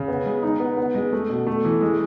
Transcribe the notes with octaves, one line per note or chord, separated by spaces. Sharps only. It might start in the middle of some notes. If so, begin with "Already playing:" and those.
Already playing: C#3
B3
G#3
D#4
B3
B3
G#3
A3
B2
A3
E3
G#3